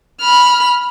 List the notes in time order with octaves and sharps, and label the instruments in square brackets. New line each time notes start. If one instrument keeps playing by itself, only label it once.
[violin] B5 F6